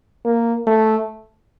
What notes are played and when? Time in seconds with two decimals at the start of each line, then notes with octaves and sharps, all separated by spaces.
0.25 A#3
0.67 A3